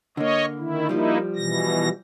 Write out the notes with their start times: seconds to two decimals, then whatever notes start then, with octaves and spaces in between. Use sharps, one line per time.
0.17 D3 A#3 C#5 D#5
0.59 D#3 E4
0.89 F3 G3 A#3 D#4 E4
1.36 B2 E3 A#6